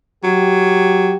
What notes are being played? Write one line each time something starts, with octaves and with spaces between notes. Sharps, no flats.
F#3 G4